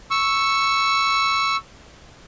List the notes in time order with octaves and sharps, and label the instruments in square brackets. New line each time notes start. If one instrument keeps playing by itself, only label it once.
[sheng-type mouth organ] C#6 E6